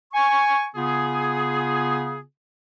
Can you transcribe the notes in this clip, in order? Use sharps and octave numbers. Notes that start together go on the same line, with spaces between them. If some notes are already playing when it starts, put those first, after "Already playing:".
G#5 C#6
C#3 B3 F4 G#4